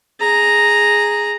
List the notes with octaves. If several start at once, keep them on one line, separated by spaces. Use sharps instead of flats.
G#4 A#5